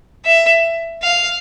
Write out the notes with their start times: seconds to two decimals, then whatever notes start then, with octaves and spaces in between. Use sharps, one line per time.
0.25 E5
1.03 F5